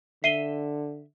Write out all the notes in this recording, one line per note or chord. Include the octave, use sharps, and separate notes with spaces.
D3 E5 C7 D#7 G7